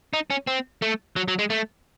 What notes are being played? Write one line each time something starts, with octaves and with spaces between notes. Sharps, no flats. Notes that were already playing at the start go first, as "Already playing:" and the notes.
D#4
C#4
C4
A3
F#3
F#3
G#3
A3